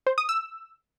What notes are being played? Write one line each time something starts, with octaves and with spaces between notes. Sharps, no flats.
C5
D#6
E6